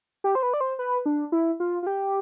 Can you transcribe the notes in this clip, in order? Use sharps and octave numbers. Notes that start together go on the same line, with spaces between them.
G4
C5
B4
D5
C5
B4
D4
E4
F4
F4
G4